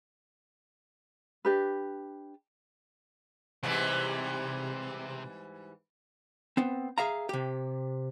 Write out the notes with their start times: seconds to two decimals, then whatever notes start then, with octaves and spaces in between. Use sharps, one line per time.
1.45 D4 G4 B4
3.63 G#2 C3 E3 G3
6.57 B3 C4
6.98 G#4 E5 F5 A#5
7.29 C3 G4